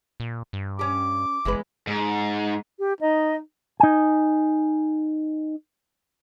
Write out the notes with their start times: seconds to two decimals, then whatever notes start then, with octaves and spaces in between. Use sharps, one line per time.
0.20 A#2
0.53 G2
0.79 C#4 G4 D6
1.45 F#1 E2 G#3 B4
1.87 G#2
2.79 G4
3.01 D#4 D#5
3.80 D#4 G#5